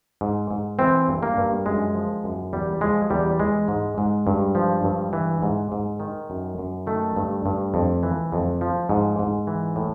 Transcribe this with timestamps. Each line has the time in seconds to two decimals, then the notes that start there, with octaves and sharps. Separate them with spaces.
0.21 G#2
0.51 G#2
0.79 E3 C4
1.08 G2
1.23 A#3
1.37 G2
1.66 F#2 G#3
1.95 F3
2.24 F#2
2.53 E2 G3
2.81 F3 G#3
3.10 E2 G3
3.39 E3 G#3
3.68 G#2
3.98 G#2
4.27 G2
4.55 F3
4.84 G2
5.13 E3
5.43 G#2
5.72 G#2
6.00 D#3
6.30 F#2
6.58 F#2
6.87 D#3 A3
7.16 G2
7.46 G2
7.74 F2
8.03 E3
8.32 F2
8.61 F3
8.89 G#2
9.19 G#2
9.47 E3
9.76 A2